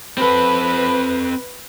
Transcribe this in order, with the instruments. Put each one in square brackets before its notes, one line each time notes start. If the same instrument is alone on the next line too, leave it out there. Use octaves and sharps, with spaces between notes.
[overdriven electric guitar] C4 A4 [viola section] B4 [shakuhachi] B5